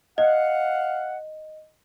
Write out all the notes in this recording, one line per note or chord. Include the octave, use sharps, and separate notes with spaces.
D#5 F5 F#5